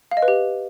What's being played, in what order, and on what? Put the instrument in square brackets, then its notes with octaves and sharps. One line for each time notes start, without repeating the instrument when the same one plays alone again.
[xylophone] F5
D#5
B4
G4